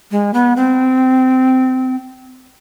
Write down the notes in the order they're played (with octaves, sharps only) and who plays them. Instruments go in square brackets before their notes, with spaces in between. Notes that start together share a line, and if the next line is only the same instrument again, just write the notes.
[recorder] G#3
B3
C4